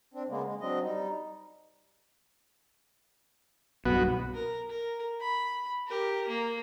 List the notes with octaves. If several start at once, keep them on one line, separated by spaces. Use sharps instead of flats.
C4 D4
C#3 G#3 A#3 B3
G#3
F#3 C4 D4 D#5
G3 D#4
B1 G2 B3 F#4
A#4
A#4
B5
G4 A#4
A#3